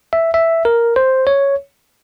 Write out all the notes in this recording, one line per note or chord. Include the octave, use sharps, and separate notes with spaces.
E5
E5
A#4
C5
C#5